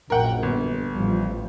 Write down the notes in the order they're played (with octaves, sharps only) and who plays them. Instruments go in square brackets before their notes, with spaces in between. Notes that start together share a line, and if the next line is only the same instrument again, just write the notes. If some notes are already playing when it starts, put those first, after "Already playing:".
[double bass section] A#1 F#2 [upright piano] A#4 F#5 G5
[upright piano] G1
[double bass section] A1 F3 G3